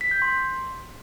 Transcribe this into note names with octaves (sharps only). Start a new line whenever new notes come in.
B6
G6
C6